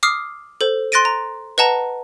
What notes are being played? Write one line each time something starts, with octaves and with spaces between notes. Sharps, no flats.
D6 D#6 F6 C7
A4 C5
C6 F#6 A6 A#6 D7 D#7
A#5
B4 D#5 F#5 A5 A#5